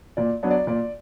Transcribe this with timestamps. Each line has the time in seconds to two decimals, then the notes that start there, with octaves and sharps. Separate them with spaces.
0.17 A#2 D5
0.43 F#3 B3 D4
0.51 D5
0.67 A#2 D5